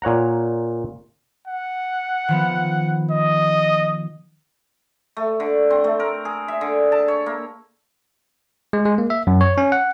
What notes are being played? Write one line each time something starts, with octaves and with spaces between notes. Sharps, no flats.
A#2 C#5 F#5 A#5
F#5
D#3 F3 B3
D#5
A3
D3
C4
A3
A#4
G#4
E5
D3
A5
C#5
A#3
G#3
G#3
A#3
E5
F#2
C#5
C#4
F#5